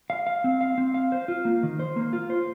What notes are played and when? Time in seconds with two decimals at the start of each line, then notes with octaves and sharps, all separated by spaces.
0.10 F5
0.27 F5
0.44 C4
0.61 F5
0.78 C4
0.94 F5
1.12 C5
1.28 F4
1.45 A#3
1.63 D#3
1.79 C5
1.96 A#3
2.13 F4
2.30 C5